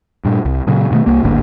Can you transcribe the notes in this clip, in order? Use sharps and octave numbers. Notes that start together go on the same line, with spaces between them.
G2 A#2
C2
A#2 C#3 F#3
G2 B2 D#3 A3
C2 A#3
D1 G#1 D3 A#3